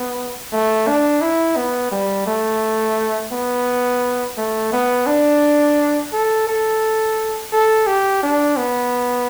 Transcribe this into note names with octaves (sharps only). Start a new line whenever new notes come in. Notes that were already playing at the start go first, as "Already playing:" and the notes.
Already playing: B3
A3
D4
E4
B3
G3
A3
B3
A3
B3
D4
A4
A4
A4
G4
D4
B3